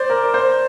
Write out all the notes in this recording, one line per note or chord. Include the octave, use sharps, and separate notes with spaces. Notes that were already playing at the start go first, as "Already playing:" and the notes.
Already playing: C5 D5
A#4
C5